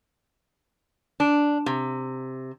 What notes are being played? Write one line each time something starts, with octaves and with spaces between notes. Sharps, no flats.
D4
C3